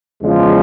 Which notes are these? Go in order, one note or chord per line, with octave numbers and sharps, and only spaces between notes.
E2 C#3 F3 G#3